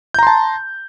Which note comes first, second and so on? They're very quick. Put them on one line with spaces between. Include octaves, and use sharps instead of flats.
G6 A#5 C6 A5